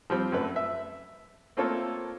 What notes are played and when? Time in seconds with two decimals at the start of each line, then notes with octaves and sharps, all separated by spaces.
0.10 F3 G3 C4
0.32 F#2 A3 B4
0.56 E5
1.57 A3 A#3 C4 F4 A4 C#5